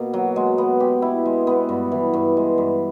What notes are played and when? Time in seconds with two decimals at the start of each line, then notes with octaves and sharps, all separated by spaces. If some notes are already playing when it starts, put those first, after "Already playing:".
Already playing: B2 A#3
0.14 F#3
0.36 G#3
0.58 B3
0.80 G4
1.02 E4
1.25 G#3
1.47 B3
1.69 G2
1.92 E3
2.13 G2
2.37 G#3
2.58 G2